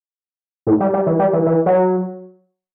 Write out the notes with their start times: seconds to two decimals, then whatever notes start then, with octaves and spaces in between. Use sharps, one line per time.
0.67 A2
0.80 G3
0.93 G3
1.06 E3
1.19 G3
1.33 E3
1.46 E3
1.66 F#3